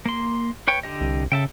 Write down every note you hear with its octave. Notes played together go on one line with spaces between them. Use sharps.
A#3 C6
B4 C#5 G5
D3 G4 D#5
C2
C#3 A4 E5 G5